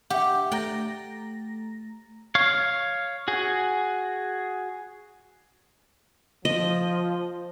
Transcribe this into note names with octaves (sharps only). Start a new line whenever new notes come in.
G4 E5 F#5
A3 G5 A#5 A#6
C#5 F5
F#4 G#4
F3 D#5